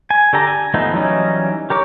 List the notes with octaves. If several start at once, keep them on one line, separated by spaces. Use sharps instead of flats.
G#5
D3 G4 A4 A#5
G#5
D3 F3 A3 B3 D#4
E3 F#3 G3 C#4 D#4
G4 A#4 C#5 D6